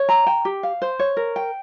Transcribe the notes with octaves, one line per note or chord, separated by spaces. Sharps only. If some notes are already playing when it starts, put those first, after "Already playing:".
Already playing: C#5
A#5
G5
G4
F5
C5
C#5
A#4
G5